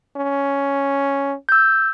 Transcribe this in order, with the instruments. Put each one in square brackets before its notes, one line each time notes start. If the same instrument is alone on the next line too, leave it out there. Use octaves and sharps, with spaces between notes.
[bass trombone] C#4
[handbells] E6 G6